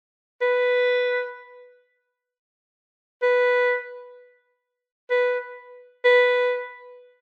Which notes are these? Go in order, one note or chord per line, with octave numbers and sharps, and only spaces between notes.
B4
B4
B4
B4